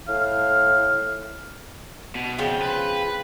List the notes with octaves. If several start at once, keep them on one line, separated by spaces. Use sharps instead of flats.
A2 F5
B2
C#3 F3 C4
B4